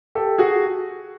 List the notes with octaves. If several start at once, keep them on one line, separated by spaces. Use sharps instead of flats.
G4 A4
F#4 G#4